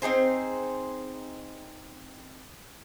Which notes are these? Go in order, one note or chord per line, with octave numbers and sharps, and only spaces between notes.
C4 D#4 G#4 C5